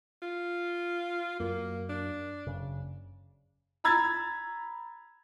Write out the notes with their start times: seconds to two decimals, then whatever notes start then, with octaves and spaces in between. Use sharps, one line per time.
0.22 F4
1.40 F#2 A#3
1.89 D4
2.47 F#1 C#3
3.84 A#5 B5 E6 G#6 A6